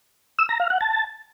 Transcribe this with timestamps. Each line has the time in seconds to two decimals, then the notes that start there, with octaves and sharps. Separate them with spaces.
0.39 E6
0.49 A#5
0.60 F5
0.70 F#5
0.81 A5